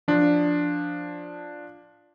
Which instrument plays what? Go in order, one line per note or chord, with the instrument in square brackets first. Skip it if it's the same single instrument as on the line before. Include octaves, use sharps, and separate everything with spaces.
[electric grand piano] F3 D4